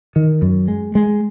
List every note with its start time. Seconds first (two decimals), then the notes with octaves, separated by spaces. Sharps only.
0.16 D#3
0.42 F#2
0.68 G#3
0.95 G#3